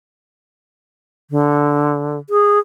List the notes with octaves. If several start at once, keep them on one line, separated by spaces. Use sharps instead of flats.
D3
G#4